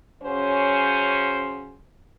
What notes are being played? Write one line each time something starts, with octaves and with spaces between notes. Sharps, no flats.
C#3 F#3 C#4 C5